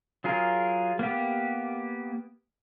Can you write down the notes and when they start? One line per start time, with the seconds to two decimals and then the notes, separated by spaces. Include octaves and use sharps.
0.24 F#3 F4 G#4 A#4
0.99 A#3 B3 G4